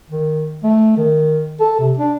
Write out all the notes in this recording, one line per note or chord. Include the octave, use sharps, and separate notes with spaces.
D#3
A3
D#3
A4
C3
D4